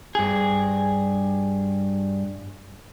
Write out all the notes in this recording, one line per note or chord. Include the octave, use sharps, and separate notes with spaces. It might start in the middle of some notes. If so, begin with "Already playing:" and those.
G2 G#4